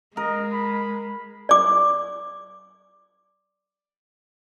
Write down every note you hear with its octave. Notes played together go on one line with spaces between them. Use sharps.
G#3 A#4 D#5
B5
D5 D6